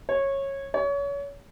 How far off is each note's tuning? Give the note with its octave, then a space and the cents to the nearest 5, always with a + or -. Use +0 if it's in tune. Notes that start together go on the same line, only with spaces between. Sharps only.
C#5 -15
C#5 +30